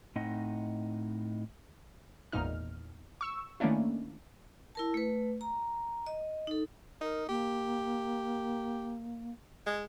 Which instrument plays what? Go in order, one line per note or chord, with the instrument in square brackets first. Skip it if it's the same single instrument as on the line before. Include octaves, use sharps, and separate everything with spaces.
[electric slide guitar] A2 C4 D#4 D#5 F#5
[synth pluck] G#1 E2 A#2 D#4 F6
C#6 E6 E7
D#3 A3 A#3 C#4 D4 E4
[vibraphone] E4 A#4 A5
A3 B4
A#5
D#5
D#4 A4
[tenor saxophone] D#4 [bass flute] A#4
[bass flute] A#3 [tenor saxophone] G4
[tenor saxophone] G#3